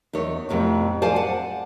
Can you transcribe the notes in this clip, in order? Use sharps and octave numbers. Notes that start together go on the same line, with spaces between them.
E2 D#4 C#5
F2 A2 C3 B3
C5 D5 F5 G#5 A5
F#5